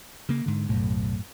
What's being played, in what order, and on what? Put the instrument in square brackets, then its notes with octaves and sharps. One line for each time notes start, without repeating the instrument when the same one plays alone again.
[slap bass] C#3 A#3
G#2 D3
[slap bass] B1 [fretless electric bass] F#2 A2